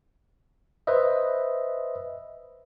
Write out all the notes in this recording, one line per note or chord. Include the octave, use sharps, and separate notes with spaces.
B4 C5 D#5 E5